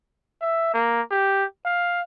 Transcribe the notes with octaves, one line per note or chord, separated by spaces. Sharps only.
E5
A#3
G4
F5